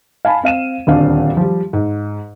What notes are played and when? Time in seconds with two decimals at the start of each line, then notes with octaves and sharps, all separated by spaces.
0.25 F5 G#5 A5 B5
0.43 C4 F5 D#7 E7
0.87 D#1 D2 C4 D4 F5
1.37 F3 G3
1.73 G#2